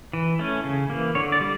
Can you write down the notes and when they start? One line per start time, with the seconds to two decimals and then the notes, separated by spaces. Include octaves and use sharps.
0.13 E3
0.39 A3 C#4
0.64 C#3
0.90 E3 A#3
1.15 D3 C#5
1.32 D5
1.41 G3